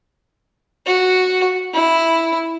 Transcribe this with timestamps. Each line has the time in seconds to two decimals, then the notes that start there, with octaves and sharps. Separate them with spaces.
0.86 F#4
1.74 E4